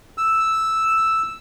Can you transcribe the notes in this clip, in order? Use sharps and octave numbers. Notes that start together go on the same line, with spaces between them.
E6